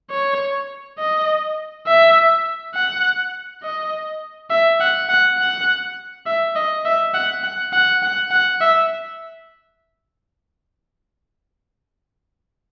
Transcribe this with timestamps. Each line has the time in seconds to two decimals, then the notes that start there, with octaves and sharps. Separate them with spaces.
0.11 C#5
0.99 D#5
1.87 E5
2.75 F#5
3.63 D#5
4.50 E5
4.80 F#5
5.09 F#5
5.38 F#5
6.26 E5
6.55 D#5
6.85 E5
7.14 F#5
7.43 F#5
7.73 F#5
8.03 F#5
8.31 F#5
8.61 E5